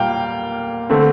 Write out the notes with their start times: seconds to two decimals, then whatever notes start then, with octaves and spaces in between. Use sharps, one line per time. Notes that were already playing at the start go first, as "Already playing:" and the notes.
Already playing: A#2 G3 A#3 F5 G5
0.90 D3 A3 C4